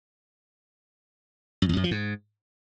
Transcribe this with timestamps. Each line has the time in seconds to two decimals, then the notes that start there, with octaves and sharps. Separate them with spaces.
1.62 F#2
1.69 E2
1.77 F#2
1.84 F3
1.91 G#2